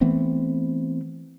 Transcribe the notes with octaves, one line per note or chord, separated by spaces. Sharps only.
E3 A3 B3 C4